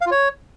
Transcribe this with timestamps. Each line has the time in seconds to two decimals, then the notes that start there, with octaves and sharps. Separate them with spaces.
0.01 F5
0.06 F4
0.11 C#5